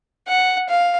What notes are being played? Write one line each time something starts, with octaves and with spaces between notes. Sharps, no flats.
F#5
F5